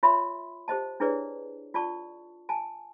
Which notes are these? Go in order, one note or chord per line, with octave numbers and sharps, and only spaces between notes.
F4 C#5 E5 B5 C6
G4 C5 D#5 A5
D4 E4 G#4 B4 C#5 D5
F4 D5 A5 C#6
G#5 A5